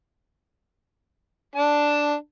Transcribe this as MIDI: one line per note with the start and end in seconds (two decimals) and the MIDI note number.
1.55 2.14 62
1.55 2.14 81